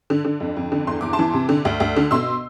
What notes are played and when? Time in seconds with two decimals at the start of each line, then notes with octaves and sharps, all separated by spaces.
0.10 D3
0.25 D3
0.40 F2
0.57 F2
0.72 D3
0.87 E2 C6
1.01 E2 D6
1.13 A5 C6
1.19 E3
1.33 C3
1.49 D3
1.65 D2
1.80 D2
1.96 D3
2.11 B2 C6 E6